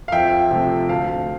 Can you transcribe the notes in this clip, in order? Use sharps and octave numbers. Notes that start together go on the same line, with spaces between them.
F5
F2 E5 G5
C3 F3 A3
D2 F5 A5